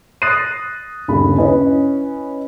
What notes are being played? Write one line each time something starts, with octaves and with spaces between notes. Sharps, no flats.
D#6 F#6 A6 A#6 C7 D#7
G1 D#2 C#3 B5
C#4 E4 B4 D#5